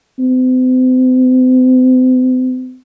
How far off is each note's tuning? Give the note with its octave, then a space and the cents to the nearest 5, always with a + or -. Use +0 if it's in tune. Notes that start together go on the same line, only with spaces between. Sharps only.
C4 -40